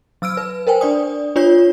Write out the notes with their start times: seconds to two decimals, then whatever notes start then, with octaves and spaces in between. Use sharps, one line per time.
0.22 F#3 E6 F6 D7
0.37 B4
0.67 A#4 C5 G5 G#5
0.81 D4 D5 D#6
1.36 D4 F4 C#5 G6